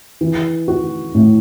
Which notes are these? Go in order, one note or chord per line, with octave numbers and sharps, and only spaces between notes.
E3
F#4
A2